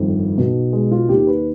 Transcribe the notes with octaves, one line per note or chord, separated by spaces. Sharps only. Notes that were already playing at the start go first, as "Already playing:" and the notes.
Already playing: G1 F2 D#3
B1 B2
G#3
F4
D#2 D#3 G4
B4